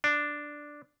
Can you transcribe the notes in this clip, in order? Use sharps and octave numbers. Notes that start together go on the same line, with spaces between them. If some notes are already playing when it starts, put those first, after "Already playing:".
D4